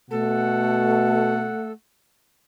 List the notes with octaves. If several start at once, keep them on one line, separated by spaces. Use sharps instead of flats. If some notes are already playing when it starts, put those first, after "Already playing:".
B2 A3 A4 F#5